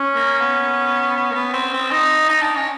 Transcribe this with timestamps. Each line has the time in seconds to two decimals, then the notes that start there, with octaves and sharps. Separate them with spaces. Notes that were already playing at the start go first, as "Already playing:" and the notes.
Already playing: C#4
0.15 A#3
0.41 B3
1.17 B3
1.31 A#3
1.34 B3
1.53 C4
1.73 C4
1.91 D#4
2.29 D#4
2.42 D4
2.56 C#4